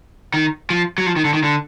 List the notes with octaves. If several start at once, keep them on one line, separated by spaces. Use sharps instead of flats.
D#3
F3
F#3
F3
D#3
D3
D#3
D3